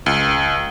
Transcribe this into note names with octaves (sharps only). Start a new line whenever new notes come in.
C#2